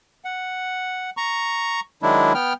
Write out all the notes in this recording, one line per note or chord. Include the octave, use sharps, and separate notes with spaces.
F#5
A#5 C#6
D#3 F#3 G#3 D4 E4
B3 G5 F6